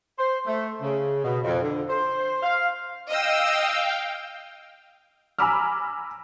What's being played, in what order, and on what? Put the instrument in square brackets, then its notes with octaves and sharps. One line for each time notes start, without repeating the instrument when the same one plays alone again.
[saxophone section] C5
A3
C#3
B2
F2
D3
C5
F5
[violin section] D#5 E6 [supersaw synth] F5 G5
[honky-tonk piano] G#5 A#5 B5 D6 E6 F6